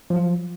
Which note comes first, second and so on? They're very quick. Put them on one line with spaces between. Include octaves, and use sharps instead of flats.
F3 F#3 F4